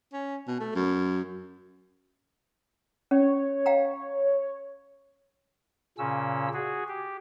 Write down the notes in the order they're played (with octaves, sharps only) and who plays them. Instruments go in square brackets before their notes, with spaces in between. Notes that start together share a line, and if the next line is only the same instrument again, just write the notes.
[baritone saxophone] C#4
B2
A3
F#2
[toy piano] C#4 [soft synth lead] C#5
[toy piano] F5 G5 A#5
[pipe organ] A#2 C#3 C#4 E6
F#4 G#4
G4